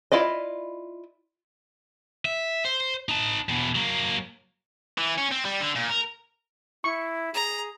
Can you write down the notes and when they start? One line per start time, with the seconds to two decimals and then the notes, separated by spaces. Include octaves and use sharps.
0.12 E4 F4 D5 D#5
2.25 E5
2.65 C5
3.09 D#4 A5
3.49 E2 B2
3.75 F#3 A#3
4.98 E3
5.18 C#4
5.32 C4
5.45 G3
5.60 D3
5.75 A#2
5.89 A#4
6.84 E4 C#6
7.34 G#4 A#5